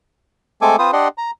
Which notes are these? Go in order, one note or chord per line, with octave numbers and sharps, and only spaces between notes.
G#3 A3 C4 A4 G#5 D6
C4 F4 B4 C5 D#6
D4 G4 D5 D#5 F#5 C6
A#5